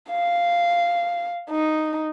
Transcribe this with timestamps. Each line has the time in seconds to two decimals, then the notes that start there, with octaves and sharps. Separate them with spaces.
0.10 F5
1.51 D#4